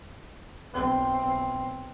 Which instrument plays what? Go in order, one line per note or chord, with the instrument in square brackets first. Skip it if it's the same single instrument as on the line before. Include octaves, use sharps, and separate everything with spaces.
[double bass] B1 C4